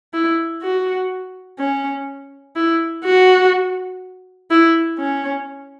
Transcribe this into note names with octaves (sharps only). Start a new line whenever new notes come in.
E4
F#4
C#4
E4
F#4
E4
C#4